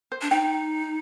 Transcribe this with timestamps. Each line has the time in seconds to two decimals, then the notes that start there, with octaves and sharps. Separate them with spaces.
0.12 C5
0.21 D4
0.30 D#4 G5